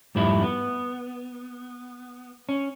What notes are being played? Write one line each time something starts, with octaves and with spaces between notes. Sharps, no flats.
F2 G#2 G3 A3 E4
B3
C#4